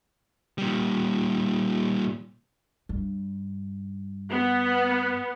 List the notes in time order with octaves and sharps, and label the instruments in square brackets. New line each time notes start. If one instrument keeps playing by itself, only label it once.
[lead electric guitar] A#2 G3
[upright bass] G2
[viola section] B3